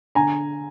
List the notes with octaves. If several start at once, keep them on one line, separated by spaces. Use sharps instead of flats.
D3 G#5 A#5